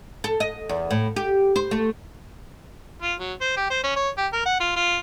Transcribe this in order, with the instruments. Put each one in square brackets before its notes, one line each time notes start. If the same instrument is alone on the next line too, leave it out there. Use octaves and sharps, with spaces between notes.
[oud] A4
D#5
E2
A2
G4
C5
A3
[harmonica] F4
F#3
C5
G4
C5
C#4
C#5
G4
A#4
F#5
F4
F4